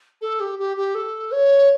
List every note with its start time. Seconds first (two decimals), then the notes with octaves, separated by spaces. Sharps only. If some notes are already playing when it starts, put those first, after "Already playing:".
0.21 A4
0.40 G4
0.59 G4
0.77 G4
0.95 A4
1.32 C#5